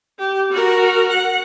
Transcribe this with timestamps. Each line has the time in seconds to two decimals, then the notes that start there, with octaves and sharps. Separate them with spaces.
0.19 G4
0.52 F#4 A#4
1.10 F#5